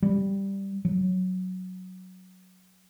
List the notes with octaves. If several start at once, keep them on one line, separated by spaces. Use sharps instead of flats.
G3
F#3